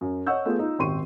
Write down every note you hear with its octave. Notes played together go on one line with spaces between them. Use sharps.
F#2
C#5 D#5 F#5 C#6 E6 G6
A3 B3 F4 G#4
D#4 F4
D#1 G#1 G4 C6 C#6 D#7